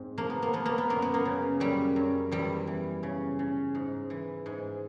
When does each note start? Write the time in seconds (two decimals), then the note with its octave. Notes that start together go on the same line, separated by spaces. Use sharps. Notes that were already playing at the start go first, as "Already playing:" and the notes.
Already playing: G#2 C4
0.18 F3 A#3
0.30 B3
0.42 A#3
0.53 F3 B3
0.66 A#3
0.78 B3
0.89 F#2 A#3
1.02 B3
1.14 A#3
1.25 C#3
1.60 F#2 G3
1.96 F#2
2.32 E2 G3
2.67 E3
3.03 C#3
3.39 C#3
3.75 G#2
4.10 E3
4.46 G#2